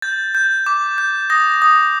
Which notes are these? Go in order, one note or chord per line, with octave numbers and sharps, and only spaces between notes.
G6 A6
G6
D6
G6
D#6 A#6
D#6